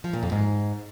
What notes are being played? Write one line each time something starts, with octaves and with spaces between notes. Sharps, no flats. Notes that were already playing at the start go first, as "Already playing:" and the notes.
F3
A#2
F2
G#2